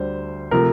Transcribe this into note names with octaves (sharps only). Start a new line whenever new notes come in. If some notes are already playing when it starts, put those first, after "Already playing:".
Already playing: D2 D3 G3 C5
C3 F3 A3 A#4